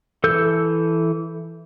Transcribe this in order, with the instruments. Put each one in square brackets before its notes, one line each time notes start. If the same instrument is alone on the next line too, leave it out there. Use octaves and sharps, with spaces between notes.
[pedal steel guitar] E3 A4 E6 G6